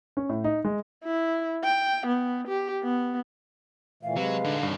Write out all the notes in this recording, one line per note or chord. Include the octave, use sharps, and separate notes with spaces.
C#4
A2
D#4
G#3
E4
G5
B3
G4
B3
A#2 E3 A3 F5
C3 F#3 G#3 B4
D3 G3 D#4
G2 C3 D#3 C#4